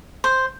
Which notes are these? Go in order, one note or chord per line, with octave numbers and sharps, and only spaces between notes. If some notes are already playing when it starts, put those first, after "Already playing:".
C5